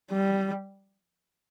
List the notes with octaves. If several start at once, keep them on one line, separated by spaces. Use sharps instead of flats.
G3